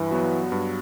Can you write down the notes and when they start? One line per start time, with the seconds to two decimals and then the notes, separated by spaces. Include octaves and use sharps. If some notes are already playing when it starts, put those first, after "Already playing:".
Already playing: G2 E3
0.11 F#3 B3 F#4
0.52 G2